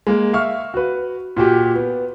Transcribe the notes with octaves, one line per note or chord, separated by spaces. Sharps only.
G#3 A#3
E5 F5 C#6 F6
F#4 B4
A#2 F#4 G4
B3